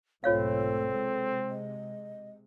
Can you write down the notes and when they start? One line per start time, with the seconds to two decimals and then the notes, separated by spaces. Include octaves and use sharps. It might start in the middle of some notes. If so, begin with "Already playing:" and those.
0.24 B1 G#2 A3 C4 F4 A4 C#5 F5
0.91 C3 G#3
1.49 D#5